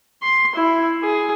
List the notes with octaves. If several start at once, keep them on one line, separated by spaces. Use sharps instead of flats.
C6
E4
G#4